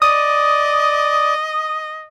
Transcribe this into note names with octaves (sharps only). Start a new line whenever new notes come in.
D5 D#5 D#6